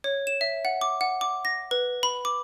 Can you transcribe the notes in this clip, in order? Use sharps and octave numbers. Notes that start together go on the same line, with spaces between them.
C#5
E7
E5
F#5
D6
F#5
D6
A#6
B4
B5
D6